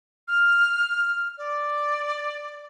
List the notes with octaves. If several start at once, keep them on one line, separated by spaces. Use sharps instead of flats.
F6
D5